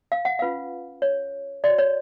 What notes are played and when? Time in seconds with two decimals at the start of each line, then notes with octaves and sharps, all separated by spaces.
0.12 F5
0.25 F#5
0.39 C#4 F4 B4 F5
1.02 C#5
1.64 F#4 C#5 D5
1.78 C#5